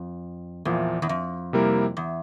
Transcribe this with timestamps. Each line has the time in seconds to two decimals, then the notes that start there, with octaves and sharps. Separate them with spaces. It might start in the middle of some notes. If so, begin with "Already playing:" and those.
Already playing: F2
0.65 E2 A#2 F3 A#3
1.02 E2
1.09 F2
1.53 C3 G3 A#3 E4 A#4
1.97 E2